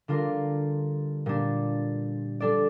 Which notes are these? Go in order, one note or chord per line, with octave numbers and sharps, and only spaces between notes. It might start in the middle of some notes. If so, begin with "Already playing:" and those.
D3 G3 D4 F4 A#4
A#2 G3 D4
G3 D4 A4 D5